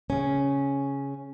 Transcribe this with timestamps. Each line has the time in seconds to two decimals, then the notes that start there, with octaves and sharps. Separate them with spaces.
0.10 C#3 C#4